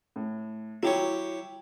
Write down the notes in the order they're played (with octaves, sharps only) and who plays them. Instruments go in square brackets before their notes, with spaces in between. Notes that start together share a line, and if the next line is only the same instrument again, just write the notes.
[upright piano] A2
[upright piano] F#3 [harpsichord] E4 G4 C#5